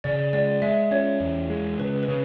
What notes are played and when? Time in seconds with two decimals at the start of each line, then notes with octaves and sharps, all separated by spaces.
0.04 C#3 D5
0.33 G#3 D5
0.62 G#3 E5
0.91 C#4 C#5
1.20 E2
1.50 G#3
1.79 C#3 B4
2.03 B4
2.08 C#3